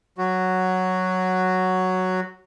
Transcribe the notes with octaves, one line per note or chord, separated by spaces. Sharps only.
F#3 F#4